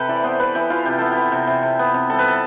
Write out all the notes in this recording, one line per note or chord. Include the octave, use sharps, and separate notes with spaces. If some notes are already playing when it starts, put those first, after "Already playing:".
Already playing: C3 G4 A4 B4
E3 D5
B3 C5
E3 B4
E3 G4
E3 F4
C3 G4
B3 A4
B3 G4
C3
C3
C3
B3
C3
G3 A4
B4
B3 A4